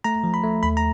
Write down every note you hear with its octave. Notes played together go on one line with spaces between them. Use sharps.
A3 A#5
F3
B5
A3
D#2 B5
A#5